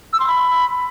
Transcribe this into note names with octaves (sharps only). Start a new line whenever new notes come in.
E6
C6
B5